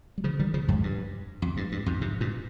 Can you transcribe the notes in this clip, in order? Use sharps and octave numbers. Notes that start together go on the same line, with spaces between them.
G3
C#3 F3
D#3 G3
C#3 F3
F2 G#2
G2
F2
G2
G2
F2 G#2
G#2 C3
G2 A#2